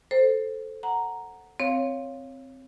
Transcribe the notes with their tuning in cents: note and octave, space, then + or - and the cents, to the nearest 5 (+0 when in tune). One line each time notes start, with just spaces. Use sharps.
A4 +0 C5 +0
F#5 +0 A#5 +0
C4 +0 C#5 +0 F5 +0